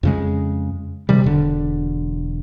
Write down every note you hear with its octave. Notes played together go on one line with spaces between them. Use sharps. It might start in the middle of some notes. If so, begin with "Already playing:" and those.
F2 C#3 G#3
C3 D#3 G3
E1 D3